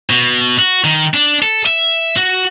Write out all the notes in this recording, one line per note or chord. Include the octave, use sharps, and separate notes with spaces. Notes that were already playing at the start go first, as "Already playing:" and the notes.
B2
F#4
D#3
D4
A4
E5
F#4